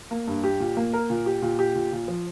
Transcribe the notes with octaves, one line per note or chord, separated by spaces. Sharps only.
A#3
G2
G4
A#2
A#3
A#4
A#2
G4
A#2
G4
A#2
A#2
F3